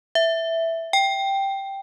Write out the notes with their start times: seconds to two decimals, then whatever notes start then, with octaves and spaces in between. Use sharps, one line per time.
0.15 E5
0.93 G5